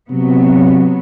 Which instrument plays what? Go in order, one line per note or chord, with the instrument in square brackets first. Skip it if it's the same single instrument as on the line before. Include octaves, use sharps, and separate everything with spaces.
[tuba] C3 [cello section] F#3 B3